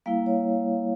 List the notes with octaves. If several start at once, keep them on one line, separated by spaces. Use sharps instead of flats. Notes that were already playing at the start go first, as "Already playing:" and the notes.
G3 A#3 E4 F5
C#5